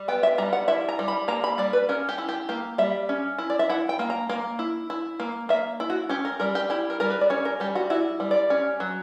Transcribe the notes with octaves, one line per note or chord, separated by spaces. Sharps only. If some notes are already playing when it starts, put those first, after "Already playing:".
Already playing: G3
B3 G5
E5
G3 A#5
F#5
E4 E5
A#5
G3
B5
A#3 A#5
B5
G3 D5
B4
C#4 A#4
G4
E4
G4
A#3 G4
G3 E5
C#4
E4
D5
E5
E4 F#5
G5
A#3
A#5
A#3
E4
E4
A#3
A#3 E5
E4
F#4
C#4 G4
A#4
G3 A#4
G4
E4 G4
A#4
G3 A#4
B4
D5
C#4 C#5
A#4
G3 G4
F#4
E4 F#4
G3
D5
C#4
F#3